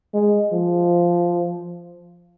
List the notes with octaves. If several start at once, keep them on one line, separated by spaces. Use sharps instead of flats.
G#3
F3